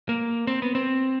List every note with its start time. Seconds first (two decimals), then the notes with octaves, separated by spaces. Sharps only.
0.09 A#3
0.47 C4
0.62 B3
0.75 C4